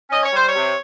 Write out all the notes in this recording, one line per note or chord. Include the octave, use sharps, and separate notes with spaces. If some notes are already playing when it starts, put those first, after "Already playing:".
C#4 D#5
C#5
G3 C5
C#5
C3